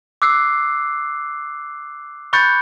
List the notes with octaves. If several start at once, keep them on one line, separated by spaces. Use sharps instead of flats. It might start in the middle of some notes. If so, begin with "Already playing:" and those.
D6 E6 F#6 C7
B5 C#6 F#6 G6 A6 C#7